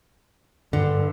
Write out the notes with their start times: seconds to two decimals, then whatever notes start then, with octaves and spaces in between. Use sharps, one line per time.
0.73 G2 D3